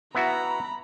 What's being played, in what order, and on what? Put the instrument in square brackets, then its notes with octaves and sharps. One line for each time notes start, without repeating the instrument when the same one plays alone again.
[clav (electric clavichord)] B3 E4 F#4 [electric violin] A#5 B5